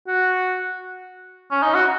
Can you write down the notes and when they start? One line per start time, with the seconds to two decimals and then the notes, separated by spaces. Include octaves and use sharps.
0.07 F#4
1.51 C#4
1.63 D#4
1.74 F#4